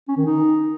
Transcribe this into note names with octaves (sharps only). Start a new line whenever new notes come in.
C#4
D#3
D#4